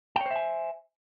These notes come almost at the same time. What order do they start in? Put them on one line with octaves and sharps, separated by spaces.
G5 C#5 C5 E5 G#5